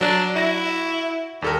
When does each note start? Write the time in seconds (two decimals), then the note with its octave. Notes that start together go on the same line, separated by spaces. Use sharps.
0.01 F#3 D4
0.36 E4 F#4 A#6
1.42 D#2 G3 A4 A#4